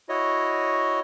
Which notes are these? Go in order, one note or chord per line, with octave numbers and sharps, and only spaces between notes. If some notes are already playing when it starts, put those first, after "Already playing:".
E4 F#4 C#5 D#5